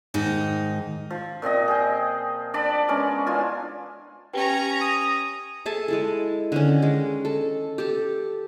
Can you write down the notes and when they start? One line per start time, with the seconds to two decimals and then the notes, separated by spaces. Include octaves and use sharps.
0.14 G#2 D#3 D#4
1.10 F3
1.42 A#2 F3 C4 D#5
1.68 G#4 A#4 G5
2.54 D4 D5 A5 B5
2.88 G#3 B3 C#4 A#4
3.26 E3 D4 F4 G#5
4.33 C#4 G4 B4 G5 A#5
4.81 D#6
5.66 G#4 A4 E5 A5
5.88 G#3 E4 A4
6.52 D3 D#3 C#4
6.82 G#3
7.25 A4
7.78 G4 A4